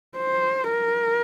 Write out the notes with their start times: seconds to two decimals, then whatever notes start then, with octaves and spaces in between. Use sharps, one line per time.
0.18 C5
0.71 A#4